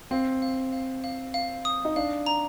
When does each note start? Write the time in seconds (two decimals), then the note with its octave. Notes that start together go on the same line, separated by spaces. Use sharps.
0.11 C4 F5
0.42 F5
0.73 F5
1.04 F5
1.34 F5
1.65 D#6
1.85 D#4
1.96 D4 F5
2.26 A#5